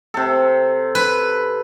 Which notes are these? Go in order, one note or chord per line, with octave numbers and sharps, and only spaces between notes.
C3 A4
B4